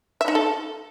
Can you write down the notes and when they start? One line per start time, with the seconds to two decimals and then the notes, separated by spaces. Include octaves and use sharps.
0.21 E5
0.28 D#4
0.35 A4